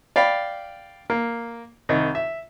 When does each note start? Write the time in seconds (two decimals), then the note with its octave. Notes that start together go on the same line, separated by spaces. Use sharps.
0.16 D5 F5 G5 B5
1.10 A#3
1.89 C2 D#3
2.15 E5